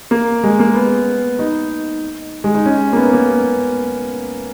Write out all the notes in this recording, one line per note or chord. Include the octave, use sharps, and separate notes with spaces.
A#3
G#3
A#3
B3
D#4
G#3
D#4
C#4
A#3
B3
A#3